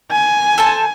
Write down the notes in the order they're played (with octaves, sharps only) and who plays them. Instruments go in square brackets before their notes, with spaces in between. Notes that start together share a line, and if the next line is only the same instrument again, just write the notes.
[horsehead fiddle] G#5
[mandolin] A4 C5 A5